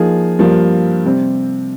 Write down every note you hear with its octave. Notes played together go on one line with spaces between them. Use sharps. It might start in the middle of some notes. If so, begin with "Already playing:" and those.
Already playing: F3 A#3 D#4 G#4
G2 F3 A#3
C3 G3 C4